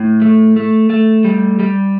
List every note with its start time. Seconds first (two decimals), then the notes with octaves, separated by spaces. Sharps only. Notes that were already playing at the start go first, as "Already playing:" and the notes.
Already playing: A2
0.22 A3
0.56 A3
0.90 A3
1.24 G3
1.59 G3